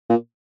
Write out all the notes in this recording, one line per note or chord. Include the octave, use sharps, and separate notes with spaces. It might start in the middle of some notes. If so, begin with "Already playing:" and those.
A#2